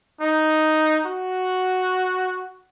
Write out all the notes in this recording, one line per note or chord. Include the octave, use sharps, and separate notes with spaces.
D#4
F#4